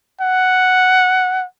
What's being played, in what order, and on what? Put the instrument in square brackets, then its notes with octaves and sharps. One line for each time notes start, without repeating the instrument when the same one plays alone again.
[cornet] F#5